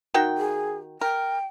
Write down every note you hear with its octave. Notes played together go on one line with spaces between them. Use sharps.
D#3 F#4 G5
G#4
A#4 G5